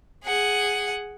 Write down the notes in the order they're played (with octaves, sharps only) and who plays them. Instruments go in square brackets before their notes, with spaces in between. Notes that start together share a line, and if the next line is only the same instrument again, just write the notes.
[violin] G#4 F#5